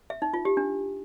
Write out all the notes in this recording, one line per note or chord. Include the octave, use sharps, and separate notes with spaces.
E5
D#4
F4
G4
D4